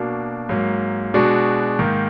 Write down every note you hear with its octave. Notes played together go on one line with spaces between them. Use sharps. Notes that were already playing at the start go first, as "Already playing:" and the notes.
Already playing: B2 A#3 D4 F#4
G#2 F#3 A#3
B2 G#3 D4 F#4
G#2 D#3 A#3